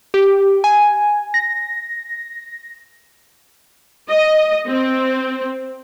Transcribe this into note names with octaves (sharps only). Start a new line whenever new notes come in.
G4
G#5
A#6
D#5
C4